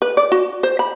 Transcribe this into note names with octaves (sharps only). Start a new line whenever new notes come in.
B4
D5
F#4
C5
B5